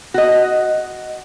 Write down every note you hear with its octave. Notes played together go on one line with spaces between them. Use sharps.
F#4 D#5